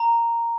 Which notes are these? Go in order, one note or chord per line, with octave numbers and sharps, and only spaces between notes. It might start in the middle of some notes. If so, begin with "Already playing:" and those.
Already playing: A#5